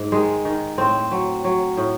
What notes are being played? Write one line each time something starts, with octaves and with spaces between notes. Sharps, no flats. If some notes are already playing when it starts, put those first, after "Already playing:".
Already playing: G#2
D#3 G#3
D#3
A2 C4
F#3
F#3
A2